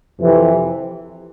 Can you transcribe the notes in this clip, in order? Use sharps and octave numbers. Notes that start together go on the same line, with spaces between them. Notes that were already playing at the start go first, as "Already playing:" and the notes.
F2 C3 E3